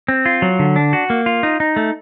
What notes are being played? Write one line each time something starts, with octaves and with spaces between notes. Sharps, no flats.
C4
F4
F#3
D3
D4
F#4
A#3
F4
D#4
D#4
A3